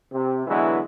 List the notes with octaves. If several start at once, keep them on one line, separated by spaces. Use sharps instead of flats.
C3
D3 E3 F#3 G#3 B3 E4